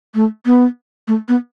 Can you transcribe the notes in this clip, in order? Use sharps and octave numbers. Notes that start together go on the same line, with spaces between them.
A3
B3
A3
B3